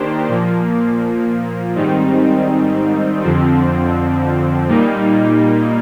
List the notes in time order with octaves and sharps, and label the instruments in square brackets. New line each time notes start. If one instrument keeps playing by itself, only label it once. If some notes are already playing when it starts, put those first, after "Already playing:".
Already playing: [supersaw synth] D#3 A#3 D4 G4 C5
A#2 F3 A#3
G#2 D#3 G3 C4 D#4
F2 D3 F3 C4
A#2 G3 A#3 D#4